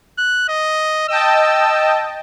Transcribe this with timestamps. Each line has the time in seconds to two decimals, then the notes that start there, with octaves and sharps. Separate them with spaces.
0.18 F#6
0.48 D#5
1.08 D#5 G5 A5 E6